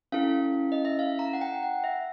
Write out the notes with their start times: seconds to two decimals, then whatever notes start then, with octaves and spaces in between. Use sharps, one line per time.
0.12 C#4 E4 A4 F5
0.72 D#5
0.85 E5
0.99 F5
1.19 A#5
1.33 F#5
1.41 G5
1.63 F#5
1.84 E5